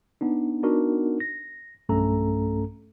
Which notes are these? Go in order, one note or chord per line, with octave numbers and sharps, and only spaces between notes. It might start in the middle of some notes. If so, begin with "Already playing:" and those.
B3 D4 D#4
B3 D4 D#4 F#4 A#4
A#6
B1 G2 A3 C#4 A4 A#5